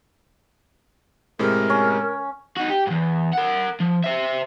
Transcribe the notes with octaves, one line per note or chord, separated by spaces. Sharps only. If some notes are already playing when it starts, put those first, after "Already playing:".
A2 C3 G#3 A#4
C#4
D#4 F#4
G4
E2 G#2
A#4 F#5
F3
C5 E5